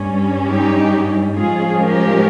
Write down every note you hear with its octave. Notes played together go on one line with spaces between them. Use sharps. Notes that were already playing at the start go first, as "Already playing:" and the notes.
Already playing: G2 G3 C#4
D#4 G4
G#2 F3 G#3 C#4 F4 G#4
G4 A#4